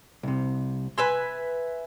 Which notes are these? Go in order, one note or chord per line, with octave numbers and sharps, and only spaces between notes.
C2 C3
B4 E5 G#5 C6